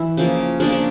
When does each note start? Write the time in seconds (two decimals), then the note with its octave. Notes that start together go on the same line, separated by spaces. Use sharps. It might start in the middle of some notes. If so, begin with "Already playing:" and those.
Already playing: E3 E4
0.17 C#3 F3 A#3
0.60 C#3 F3 A#3 D4
0.72 D4